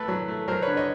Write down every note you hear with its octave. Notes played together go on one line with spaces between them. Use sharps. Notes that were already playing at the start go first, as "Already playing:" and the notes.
Already playing: A3 A4 B4
F#3
A3
F#3 A#4 C5
B4 C#5
D3
C#5 D#5